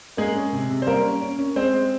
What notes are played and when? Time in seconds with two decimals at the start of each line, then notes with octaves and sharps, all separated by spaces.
0.17 G#3 A#3 G#4
0.36 C#4
0.53 C3
0.70 C3
0.82 C5
0.87 G3 A#3 A#4
1.05 C#4
1.21 C#4
1.39 C#4
1.56 G#3 C4 C5
1.73 G#3